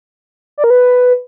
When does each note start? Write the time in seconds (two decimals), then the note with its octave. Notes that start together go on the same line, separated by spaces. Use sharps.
0.58 D5
0.64 A#4
0.70 B4